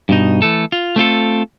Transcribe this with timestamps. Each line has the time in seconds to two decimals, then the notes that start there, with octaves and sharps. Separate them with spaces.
0.09 G2 B2 D#4
0.42 E3 A3 A4
0.72 F4
0.96 A3 C4 F4 A4